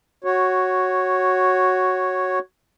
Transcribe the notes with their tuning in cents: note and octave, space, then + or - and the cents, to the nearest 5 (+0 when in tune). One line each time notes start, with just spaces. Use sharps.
F#4 +0 C#5 -5